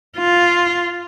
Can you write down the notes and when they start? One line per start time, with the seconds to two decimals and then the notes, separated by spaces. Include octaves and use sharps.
0.18 F4